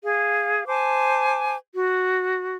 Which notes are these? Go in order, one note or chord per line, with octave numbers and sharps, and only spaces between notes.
G#4 F5
C5 G#5 A5 D6
F#4